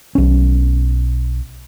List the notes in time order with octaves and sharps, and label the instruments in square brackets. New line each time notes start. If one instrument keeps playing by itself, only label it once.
[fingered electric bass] B1 C#4